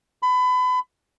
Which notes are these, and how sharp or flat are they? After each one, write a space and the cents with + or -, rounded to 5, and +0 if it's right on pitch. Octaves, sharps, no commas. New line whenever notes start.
B5 +30